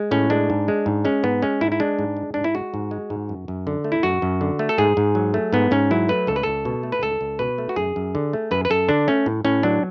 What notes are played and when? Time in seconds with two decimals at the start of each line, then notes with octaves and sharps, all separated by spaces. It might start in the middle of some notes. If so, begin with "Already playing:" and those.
Already playing: G#3
0.11 A2 C#4
0.30 G#3 D4
0.50 G#2
0.68 G#3
0.86 G#2
1.05 G#3 C#4
1.23 G#2 B3
1.42 G#3 C#4
1.61 G#2 E4
1.72 E4
1.80 G#3 D4
1.99 G#2
2.17 G#3
2.34 G#2 D4
2.44 E4
2.55 G#3 F#4
2.74 G#2
2.91 G#3
3.10 G#2
3.29 F#2
3.48 F#2
3.67 D3
3.84 A3
3.92 E4
4.03 F#2 F#4
4.22 F#2
4.41 D3
4.59 A3
4.69 A4
4.78 G#2 G#4
4.97 G#2
5.15 F#3
5.34 A3
5.53 G#2 B3
5.71 G#2 C#4
5.91 F#3 E4
6.09 A3 B4
6.27 C#2 A4
6.36 B4
6.43 C#2 A4
6.65 B2
6.83 A3
6.92 B4
7.02 C#2 A4
7.21 C#2
7.39 B2 B4
7.58 A3
7.69 F#4
7.76 F#2 G#4
7.96 F#2
8.15 D3
8.33 A3
8.51 F#2 B4
8.65 B4
8.70 F#2 A4
8.89 D3 D4
9.08 A3 C#4
9.26 A2
9.44 A2 C#4
9.63 F#3 D4